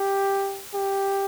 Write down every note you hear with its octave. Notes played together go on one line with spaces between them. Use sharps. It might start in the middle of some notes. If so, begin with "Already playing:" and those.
Already playing: G4
G4